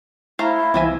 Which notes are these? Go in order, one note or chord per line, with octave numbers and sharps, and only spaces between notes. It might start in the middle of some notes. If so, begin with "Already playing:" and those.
A3 E4 C5 F5 A#5
C2 E3 F3 C4 E5 G#5